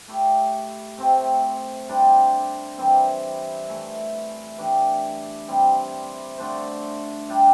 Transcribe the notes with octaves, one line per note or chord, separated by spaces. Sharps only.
A3 E4 G4
C3 A3 C4
G3 D4 G4 C5
E3 G3 C4
E3 A3 E4
E3 A3 D4 G4
C3 G3 C4
D3 A3 D4 C5
G3 D4 G4 E5